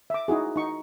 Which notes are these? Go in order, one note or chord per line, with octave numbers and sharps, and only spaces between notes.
E5 D6
D#4 E4 F#4 G#4
D#4 C#6